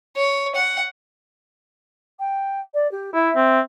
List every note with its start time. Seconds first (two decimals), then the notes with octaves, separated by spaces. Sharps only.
0.16 C#5
0.55 F#5
2.19 G5
2.74 D5
2.91 G4
3.14 E4 E5
3.36 C4